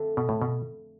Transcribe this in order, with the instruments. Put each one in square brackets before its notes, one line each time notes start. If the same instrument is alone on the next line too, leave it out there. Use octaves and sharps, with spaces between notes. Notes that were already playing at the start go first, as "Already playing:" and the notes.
Already playing: [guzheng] F2 D3 A3 D4
[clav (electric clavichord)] B2
A2
B2